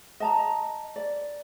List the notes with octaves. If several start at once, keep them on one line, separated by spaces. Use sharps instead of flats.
D#5 A5 A#5
D5